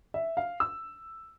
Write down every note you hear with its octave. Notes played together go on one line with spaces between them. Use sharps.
E5
F5
E6